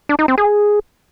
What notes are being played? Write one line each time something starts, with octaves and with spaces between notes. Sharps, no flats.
D4
D#4
C4
G#4